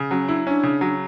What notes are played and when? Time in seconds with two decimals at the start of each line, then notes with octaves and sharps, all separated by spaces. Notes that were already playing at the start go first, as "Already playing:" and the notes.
Already playing: C#3
0.11 F#3 C#4
0.28 D4 E4
0.47 C#4 D4
0.63 C#3
0.81 F#3